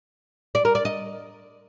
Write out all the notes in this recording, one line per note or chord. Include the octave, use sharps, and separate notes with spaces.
D5
A#4
D5
D#5